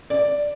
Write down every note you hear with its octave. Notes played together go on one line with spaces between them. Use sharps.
D5